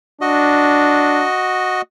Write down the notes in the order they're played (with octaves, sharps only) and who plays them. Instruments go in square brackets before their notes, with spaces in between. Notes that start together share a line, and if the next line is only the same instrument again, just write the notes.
[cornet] D4 [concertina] F#4 D#5